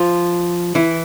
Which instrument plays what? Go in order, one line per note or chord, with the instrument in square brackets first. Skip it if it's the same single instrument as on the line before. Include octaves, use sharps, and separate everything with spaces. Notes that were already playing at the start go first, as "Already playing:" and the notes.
Already playing: [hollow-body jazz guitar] F3 F4
E3 E4